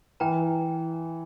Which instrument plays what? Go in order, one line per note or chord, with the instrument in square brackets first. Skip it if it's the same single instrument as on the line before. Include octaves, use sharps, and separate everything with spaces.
[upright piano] E3 [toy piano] B4 G5 A#5